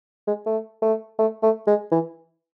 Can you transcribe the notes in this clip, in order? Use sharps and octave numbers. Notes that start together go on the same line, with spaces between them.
G#3
A3
A3
A3
A3
G#3
E3